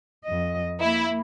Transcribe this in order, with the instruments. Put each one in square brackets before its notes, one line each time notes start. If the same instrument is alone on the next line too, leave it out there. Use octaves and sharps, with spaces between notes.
[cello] F2 D#5
[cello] A#3 [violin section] E4